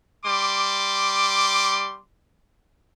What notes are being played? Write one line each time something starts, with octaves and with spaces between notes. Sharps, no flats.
G3 C6 D6